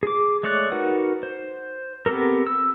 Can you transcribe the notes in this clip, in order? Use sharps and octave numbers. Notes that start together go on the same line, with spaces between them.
G#4 D6
G#3 A3 C#5 D5 F#6
D#4 F#4 A#4 B4 F#5
C5
B3 C4 G4 A4 A#4
E6